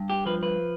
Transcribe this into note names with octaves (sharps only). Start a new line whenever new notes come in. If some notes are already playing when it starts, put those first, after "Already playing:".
Already playing: G2
G4
F3 B4
B4